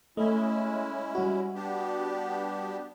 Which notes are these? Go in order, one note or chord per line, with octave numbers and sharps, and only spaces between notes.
G#3 A3 C#4 E4 D#5
G3 F#4
B3 D4 G4